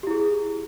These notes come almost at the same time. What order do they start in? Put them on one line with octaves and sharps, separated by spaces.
G4 E4 G#4